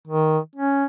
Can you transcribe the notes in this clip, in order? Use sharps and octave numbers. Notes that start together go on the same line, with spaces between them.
D#3
C#4